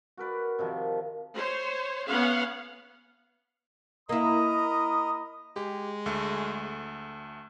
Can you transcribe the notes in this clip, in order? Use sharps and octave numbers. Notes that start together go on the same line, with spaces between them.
F#4 A#4 B4 D5
C3 D#3 F3 G4
C5 C#5
B3 C#4 F5 F#5
A#3 E4 A#4 D#5 A#5 B5 D#6
G#3 G4
D2 A3